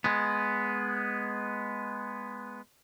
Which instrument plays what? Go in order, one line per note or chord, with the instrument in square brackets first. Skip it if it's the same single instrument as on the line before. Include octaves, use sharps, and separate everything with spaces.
[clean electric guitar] G#3 B3